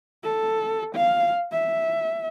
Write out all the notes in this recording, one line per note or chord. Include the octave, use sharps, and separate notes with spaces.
A4
F5
E5